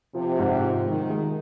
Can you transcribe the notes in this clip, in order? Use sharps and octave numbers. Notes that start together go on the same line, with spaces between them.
C3 F3
G#2
F3
D#3 G#3
G#3